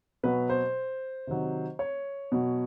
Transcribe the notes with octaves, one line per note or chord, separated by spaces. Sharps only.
B2 F#3 B4
C5
C3 D#3 F#3
C#5
B2 F#3